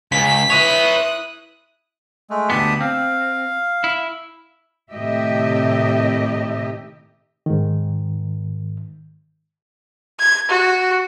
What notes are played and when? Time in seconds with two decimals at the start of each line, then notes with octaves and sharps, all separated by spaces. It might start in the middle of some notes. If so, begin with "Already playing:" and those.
0.12 C#2 G#4 B6
0.50 E4 B4 C#5 D#6 F#6
2.30 G#3 A3
2.50 D2 G#2 B3 G4 A5 D#6
2.81 C4 F5
3.84 E4
4.91 A2 C3 D#3 G4 D#5 E5
7.46 G#2 D#3
10.20 G#6
10.49 F#4